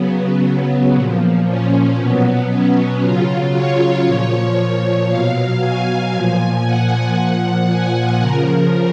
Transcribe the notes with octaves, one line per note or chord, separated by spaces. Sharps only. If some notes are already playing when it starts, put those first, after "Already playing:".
Already playing: C#3 F#3 B3
A#2 F3
C#4
B2 F#3 B3
C#4
C#3 F#3 F4
C#5
A#2 F3
B2 F#3 F5
G#5
A#2 F3 G#5
F#5
A#2 F3
G#5
C#3 F3 A#4